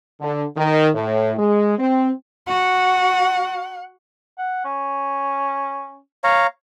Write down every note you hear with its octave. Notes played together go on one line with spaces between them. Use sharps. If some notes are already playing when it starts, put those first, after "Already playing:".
D3
D#3
A2
G#3
C4
F#4 F#5
F#5
C#4
C#5 F5 A#5